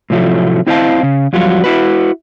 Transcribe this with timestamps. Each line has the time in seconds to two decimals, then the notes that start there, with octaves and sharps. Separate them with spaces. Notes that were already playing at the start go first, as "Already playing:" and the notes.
0.10 A2 C3 F3 F#3 A3
0.67 C4 E4 C5 D#5 F5 A5
1.03 C#3
1.33 F2 F#3 G3 F4 F#4
1.64 E4 F#4 B4